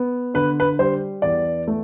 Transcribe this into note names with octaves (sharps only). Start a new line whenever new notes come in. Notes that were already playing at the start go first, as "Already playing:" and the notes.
Already playing: B3
D3 B4
B4
G3 C5
E2 D5
A3